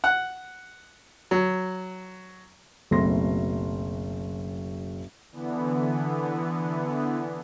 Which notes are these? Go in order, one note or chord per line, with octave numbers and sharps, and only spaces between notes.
F#5
F#3
F#1 B1 A3 C4 C6 A#6
D3 E3 B3